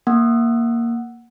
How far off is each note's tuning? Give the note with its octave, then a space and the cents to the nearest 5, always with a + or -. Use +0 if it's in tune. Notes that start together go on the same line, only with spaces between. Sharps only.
A#3 +0 F#5 +0 E6 +0